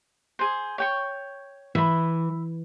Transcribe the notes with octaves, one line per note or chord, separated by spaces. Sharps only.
G#4 C5
C#5 G5 C#6
E3 E5 B5